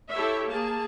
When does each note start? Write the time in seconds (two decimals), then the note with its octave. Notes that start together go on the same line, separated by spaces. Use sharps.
0.12 E4 G4 A4 C#5 E5
0.48 A#3 G#4 A5